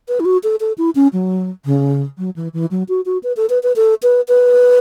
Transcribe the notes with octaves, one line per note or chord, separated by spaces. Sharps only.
B4
E4
F#4
A4
A4
E4
C#4
F#3
C#3
F#3
E3
E3
F#3
F#4
F#4
B4
A4
B4
B4
A4
B4
B4